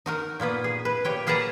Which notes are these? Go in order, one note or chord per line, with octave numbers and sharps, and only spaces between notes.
D#4 F#4 A#4
A#2 A#3 B3 B4
G#4
B4
A#2 G4 C#5 G5
A#3 G#4 B4 F#5 A5 A#5